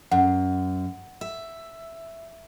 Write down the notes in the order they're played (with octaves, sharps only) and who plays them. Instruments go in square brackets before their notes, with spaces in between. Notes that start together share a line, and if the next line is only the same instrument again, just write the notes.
[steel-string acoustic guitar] F#2 [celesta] F#5
[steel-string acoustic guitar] E5